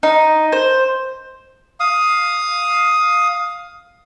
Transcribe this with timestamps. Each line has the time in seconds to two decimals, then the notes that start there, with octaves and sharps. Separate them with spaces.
0.03 D#4
0.52 C5
1.80 F5 D#6